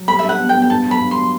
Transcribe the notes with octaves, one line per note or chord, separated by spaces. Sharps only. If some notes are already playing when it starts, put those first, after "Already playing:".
Already playing: F#3
G3 B5
E5
D4 F#5
B3
G5
B3
G5
G2 A5
F#3
B5
G2
C6
F#3